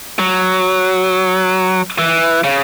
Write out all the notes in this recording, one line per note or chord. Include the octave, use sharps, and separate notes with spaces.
F#3
E3
C#3